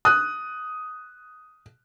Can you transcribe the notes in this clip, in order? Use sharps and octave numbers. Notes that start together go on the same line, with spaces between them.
D#6 F#6